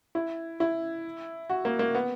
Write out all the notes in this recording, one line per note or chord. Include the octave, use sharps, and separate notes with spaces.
E4
E4
F#4
A#3
A#3
B3